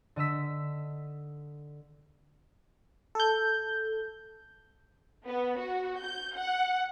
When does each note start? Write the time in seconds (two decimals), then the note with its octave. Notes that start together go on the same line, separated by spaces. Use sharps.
0.16 D3 D#5 E6 B6
3.15 A4 G6
5.28 B3
5.59 F#4
6.04 G6
6.36 F#5